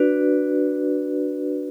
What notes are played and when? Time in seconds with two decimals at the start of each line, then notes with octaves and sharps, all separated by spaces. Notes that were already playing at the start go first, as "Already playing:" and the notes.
Already playing: D4 F#4 B4 D5